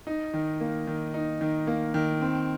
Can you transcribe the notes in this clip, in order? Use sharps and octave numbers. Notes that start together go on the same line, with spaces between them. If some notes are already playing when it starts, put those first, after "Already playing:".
D#4
D#3
A#3
D#3
D#4
D#3
A#3
D#3
C4